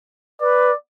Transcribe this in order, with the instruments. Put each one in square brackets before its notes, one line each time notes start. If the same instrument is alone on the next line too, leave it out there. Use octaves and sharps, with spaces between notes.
[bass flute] B4 [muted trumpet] D5